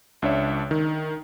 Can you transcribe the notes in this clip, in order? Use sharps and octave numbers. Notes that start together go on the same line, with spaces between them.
C#2 D4 C#5 E5
D#3